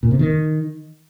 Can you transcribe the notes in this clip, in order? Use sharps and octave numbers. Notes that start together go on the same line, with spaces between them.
A#2
C3
D#3